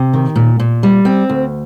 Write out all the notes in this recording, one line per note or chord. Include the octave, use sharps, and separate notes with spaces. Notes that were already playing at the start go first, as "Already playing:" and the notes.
Already playing: C3
D#3
A#2
A#2
G3
C4
D2